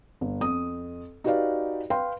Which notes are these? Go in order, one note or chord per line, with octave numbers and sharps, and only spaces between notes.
G1
F2 D#6
D#4 F#4 G4 B4 D5 F5
B4 F5 G5 C6